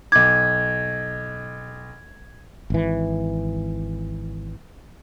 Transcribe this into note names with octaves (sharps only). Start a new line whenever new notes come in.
B1 D6 G#6
G#1 E3